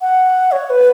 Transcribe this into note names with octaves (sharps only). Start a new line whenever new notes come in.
F#5
C#5
B4